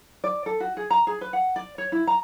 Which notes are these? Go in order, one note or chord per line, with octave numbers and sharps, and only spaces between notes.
D5
A4
F#4
G#4
A#5
G#4
B4
F#5
D5
C#5
E4
A#5